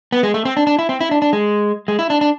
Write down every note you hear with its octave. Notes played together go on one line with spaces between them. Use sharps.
B3
G#3
A3
C4
D4
D4
E4
C4
E4
D4
D4
G#3
G#3
E4
D4
D4